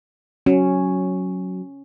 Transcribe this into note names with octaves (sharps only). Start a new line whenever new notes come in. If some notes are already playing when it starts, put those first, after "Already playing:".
F#3 C#4